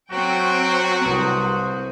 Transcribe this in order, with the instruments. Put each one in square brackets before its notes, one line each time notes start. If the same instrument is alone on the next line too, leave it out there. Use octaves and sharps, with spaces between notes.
[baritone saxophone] F#3 [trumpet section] A3 F#4 [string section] C4 G5
[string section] C2 [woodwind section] B4 C5 D#6